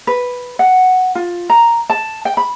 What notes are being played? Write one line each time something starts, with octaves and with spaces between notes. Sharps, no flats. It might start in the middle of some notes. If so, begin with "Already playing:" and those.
B4
F#5
F4
A#5
A5
G5
B5